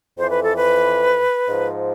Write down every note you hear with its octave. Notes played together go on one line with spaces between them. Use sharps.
F2 E3 C5
B4
A4
B4
G#2 F3